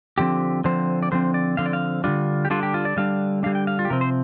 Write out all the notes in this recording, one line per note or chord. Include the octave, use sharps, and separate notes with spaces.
D3 F3 C4 G4
D3 F3 C4 C5
D5
D3 F3 C4 C5
D5
D3 F3 C4 F5
D5
F5
D3 G3 D4 F4
G4
D3 G3 D4 F4
G4
F4
D5
D3 G3 D4 F5
D3 G3 D4 F5
G5
F5
F4
G4
C3 F3 C4 A#4
C5